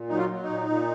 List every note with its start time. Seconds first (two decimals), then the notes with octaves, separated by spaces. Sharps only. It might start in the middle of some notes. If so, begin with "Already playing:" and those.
Already playing: A#2
0.09 F#3 D#4
0.18 F4
0.30 F#3
0.43 D#4
0.49 A#2
0.69 A#2